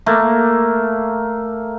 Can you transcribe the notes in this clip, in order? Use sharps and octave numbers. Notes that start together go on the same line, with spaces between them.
A3 A#3